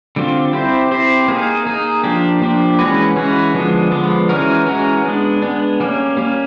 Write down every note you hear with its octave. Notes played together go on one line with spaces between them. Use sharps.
D3 G3 C4 F4
C4 E4 G4 C5
C4 E4 G4 C5
A#3 D#4 G#4
A#3 D#4 G#4
F3 A#3 D4 G4
F3 A#3 D4 G4
E3 G#3 C#4 F#4 B4
E3 G#3 C#4 F#4 B4
D3 F3 G#3 B3 D4
D3 F3 G#3 B3 D4
E3 G#3 C#4 F#4 A#4
E3 G#3 C#4 F#4 A#4
G#3 B3 D4
G#3 B3 D4
G3 A#3 C#4
G3 A#3 C#4